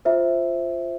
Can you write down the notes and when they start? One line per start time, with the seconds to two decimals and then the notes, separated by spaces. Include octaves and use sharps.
0.05 F4 C5 E5